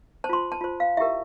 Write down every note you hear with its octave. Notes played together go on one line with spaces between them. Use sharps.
C5 A5
F4 C6
A5
F4 C5
F5
E4 G4 A#4 E5